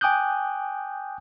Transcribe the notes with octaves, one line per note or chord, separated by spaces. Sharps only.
G5 G#5 D6 D#6 F#6 G6